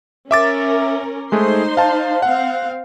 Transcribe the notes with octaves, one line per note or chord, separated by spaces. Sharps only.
C#4 A#4 E5 D6 A6
G#3 A3 D#4 G#4 C5 C6
F5 A5
C4 F5 F#5